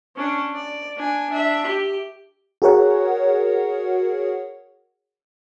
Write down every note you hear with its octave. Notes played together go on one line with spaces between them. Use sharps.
C#4 D4
D5
D4 G#5
D4 E5
G4
F#4 G#4 A#4 C#5 F#5